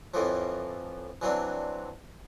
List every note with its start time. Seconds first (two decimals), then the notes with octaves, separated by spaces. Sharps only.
0.14 F2 A2 E3 F3
1.22 E3 F#3 C4 D4